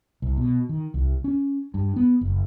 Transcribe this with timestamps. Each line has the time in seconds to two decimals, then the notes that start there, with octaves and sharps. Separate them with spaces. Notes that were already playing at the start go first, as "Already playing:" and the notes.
0.22 C2
0.37 B2
0.69 D#3
0.94 C2
1.24 C#4
1.74 G2
1.96 B3
2.21 F#1